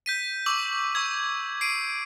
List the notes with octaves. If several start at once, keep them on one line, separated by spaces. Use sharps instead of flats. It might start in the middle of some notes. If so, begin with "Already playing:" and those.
G6 B6 D#7
C#6 D6 E6 F#7
C#6 E6 G#6
C7 D7 D#7